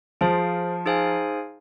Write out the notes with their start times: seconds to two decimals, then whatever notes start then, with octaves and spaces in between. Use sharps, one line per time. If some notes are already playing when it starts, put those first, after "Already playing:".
0.21 F3 G#4 C5 F5
0.86 D#4 G#4 C5 F5 G#5